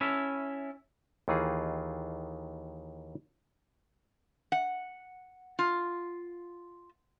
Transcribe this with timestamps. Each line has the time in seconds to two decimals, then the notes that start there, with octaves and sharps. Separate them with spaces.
0.01 C#4 E4 A4 E5
1.28 D#2 D#3 E3 D#4 F4 G#4
4.52 F#5
5.59 F4